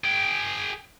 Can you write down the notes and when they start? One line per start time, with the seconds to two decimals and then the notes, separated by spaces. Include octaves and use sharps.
0.04 G#4 G5